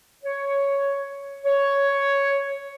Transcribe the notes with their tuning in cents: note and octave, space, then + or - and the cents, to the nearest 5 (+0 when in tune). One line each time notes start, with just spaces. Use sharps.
C#5 +5
C#5 +5